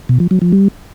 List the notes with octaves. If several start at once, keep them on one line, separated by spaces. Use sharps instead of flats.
B2
F3
F#3
F3
G3